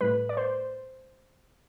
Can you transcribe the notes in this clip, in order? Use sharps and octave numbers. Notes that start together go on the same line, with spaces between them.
A2 G3 B4
D5
C5